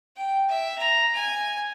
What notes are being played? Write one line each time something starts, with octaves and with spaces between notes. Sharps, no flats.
G5
E5
A#5
G#5